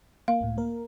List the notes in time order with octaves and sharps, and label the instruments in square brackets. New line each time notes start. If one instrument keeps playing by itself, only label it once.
[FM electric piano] A#3 [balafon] F5
[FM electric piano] C#2 A2
A#3 A#4